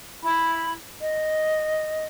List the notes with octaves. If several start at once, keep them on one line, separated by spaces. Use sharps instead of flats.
E4 B5
D#5